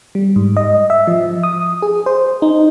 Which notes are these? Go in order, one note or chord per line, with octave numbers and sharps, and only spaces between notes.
G3
G#2
D#5
E5
F3
D#6
G#4
C5
D#4